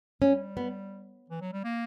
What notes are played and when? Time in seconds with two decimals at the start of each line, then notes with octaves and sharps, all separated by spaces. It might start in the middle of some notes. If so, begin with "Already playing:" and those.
0.22 G3 C#4
0.57 B3
1.30 E3
1.41 F#3
1.53 G3
1.64 A#3